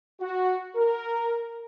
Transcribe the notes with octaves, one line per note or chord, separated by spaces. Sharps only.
F#4
A#4